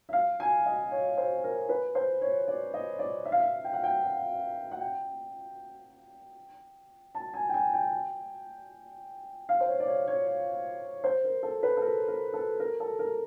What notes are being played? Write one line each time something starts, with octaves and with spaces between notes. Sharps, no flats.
E5
F5
G#5
D#5
C#5
C5
A#4
B4
C5
C#5
D5
D#5
D5
E5
F5
E5
G5
F#5
G5
F#5
F#5
G5
A5
G#5
G5
G#5
G5
F5
C5
C#5
D5
C#5
C#5
C5
A#4
A4
B4
A4
A#4
A#4
A4
A#4
A4
A#4